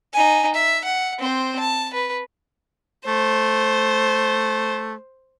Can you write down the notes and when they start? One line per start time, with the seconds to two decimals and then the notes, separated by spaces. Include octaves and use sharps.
0.14 D#4 G#5
0.54 E5
0.84 F#5
1.19 C4 C5
1.59 A5
1.93 B4
3.07 A3 C5